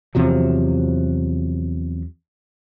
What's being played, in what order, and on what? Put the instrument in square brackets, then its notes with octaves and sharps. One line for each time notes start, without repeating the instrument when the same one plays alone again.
[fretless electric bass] E2 C3 F3 F#3